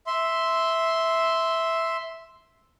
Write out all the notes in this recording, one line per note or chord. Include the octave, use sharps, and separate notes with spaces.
E5 C6